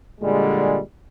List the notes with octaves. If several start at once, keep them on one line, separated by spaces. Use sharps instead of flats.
A#2 D3 G3 G#3